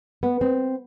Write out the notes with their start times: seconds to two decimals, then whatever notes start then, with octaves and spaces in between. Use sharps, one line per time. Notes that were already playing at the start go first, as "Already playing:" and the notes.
0.23 B3
0.41 C4